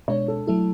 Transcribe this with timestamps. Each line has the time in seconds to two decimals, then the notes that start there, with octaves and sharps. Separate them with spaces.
0.08 B2 G#3 D4 C#5
0.28 A4
0.47 F#3 A3 E4 A4